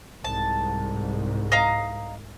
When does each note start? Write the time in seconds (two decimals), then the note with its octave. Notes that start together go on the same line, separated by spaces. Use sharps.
0.24 C2 G#2 A5
1.52 D#5 F5 A#5